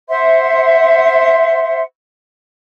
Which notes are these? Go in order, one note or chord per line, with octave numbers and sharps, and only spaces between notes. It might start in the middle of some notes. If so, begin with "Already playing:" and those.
C5 E5 F#5 C6